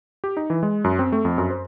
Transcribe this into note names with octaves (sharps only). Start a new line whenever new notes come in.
G4
D#4
E3
G#3
F#2
C4
A3
F2
F#2
C5